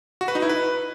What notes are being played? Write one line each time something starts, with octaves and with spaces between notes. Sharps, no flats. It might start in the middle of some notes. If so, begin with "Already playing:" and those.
F#4
B4
D#4
E4
B4